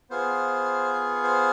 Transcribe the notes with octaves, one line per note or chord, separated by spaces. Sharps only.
B3 F4 G#4 C5
C5